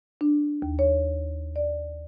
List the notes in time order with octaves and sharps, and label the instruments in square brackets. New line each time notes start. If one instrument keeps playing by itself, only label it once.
[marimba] D4
D#2
C#5
D5